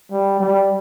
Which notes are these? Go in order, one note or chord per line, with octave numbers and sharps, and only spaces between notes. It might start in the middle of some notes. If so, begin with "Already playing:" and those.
G3
G3